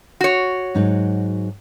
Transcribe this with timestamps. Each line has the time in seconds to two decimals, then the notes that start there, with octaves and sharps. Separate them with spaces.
0.21 F#4 C#5
0.75 G#2 F#3 D#4